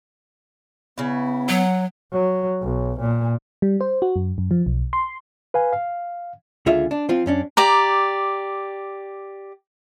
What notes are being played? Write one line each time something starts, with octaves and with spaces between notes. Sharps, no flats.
C#3 B3 E4
F#3 F#5
F#3
B1
A#2
G3
C5
F#4
F#2
F#2
F3
B1
C6
B4 F5 G#5
F5
C#2 D3 F4 G#4 E5
D4
F3 C4 F4
F#2 C#4 D4
G4 D5 A#5